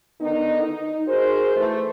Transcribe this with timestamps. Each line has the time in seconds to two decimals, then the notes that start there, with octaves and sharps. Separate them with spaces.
0.20 D3 D#3 B3 D#4
0.62 D#4
1.07 F#4 G#4 A#4 C5
1.56 E3 A3